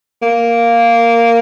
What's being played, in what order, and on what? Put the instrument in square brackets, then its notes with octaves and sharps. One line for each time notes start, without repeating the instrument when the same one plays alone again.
[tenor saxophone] A#3